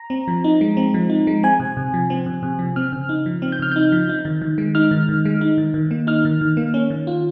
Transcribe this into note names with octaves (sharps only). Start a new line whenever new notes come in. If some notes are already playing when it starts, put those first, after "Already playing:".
Already playing: A#5
C4
F3
D#4
G#3
C4
F3
D#4
G#3
C4 G#5
C3
C3
F3
C4
C3
C3
F3
C4 F6
C#3
D#4
F3
C4
G6
C#3 F6
D#4 G6
F3
D#4
D#3
D#3
G#3
D#4 F6
D#3
D#3
G#3
D#4
D#3
D#3
A#3
D#4 F6
D#3
D#3
A#3
C#4
D#3
F4